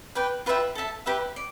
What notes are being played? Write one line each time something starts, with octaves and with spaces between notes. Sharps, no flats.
B4 D5 G5
F4 B4 E5 G5
A4 E5 A5
G4 B4 E5 B5
D5